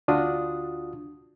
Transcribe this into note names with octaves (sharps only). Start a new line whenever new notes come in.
D2 D4 F4 F#4 D#6